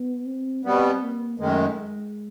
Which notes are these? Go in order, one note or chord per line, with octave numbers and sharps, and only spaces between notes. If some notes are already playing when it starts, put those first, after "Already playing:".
Already playing: B3
C4
B2 G3 B3 C4
A#3
F#2 D#3 G#3 A3
G#3